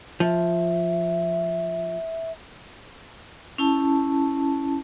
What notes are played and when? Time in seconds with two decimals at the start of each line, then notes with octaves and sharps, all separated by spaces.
0.20 F3 E5
3.58 C#4 E4 A5